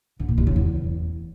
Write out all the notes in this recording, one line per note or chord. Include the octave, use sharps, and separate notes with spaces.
D3
A#2
C3
C#3
E2